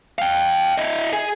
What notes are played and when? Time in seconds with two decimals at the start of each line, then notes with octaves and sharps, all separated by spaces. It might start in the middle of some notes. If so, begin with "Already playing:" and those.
0.18 F5 G5
0.78 E4 D#5
1.13 G#4